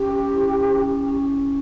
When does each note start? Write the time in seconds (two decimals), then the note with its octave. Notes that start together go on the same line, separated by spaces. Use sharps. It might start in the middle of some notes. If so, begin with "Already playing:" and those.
Already playing: C#4 G4
0.32 E4
0.70 C#4
1.08 C#4